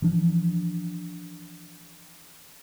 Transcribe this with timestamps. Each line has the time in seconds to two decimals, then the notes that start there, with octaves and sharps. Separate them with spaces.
0.02 E3 F3 D4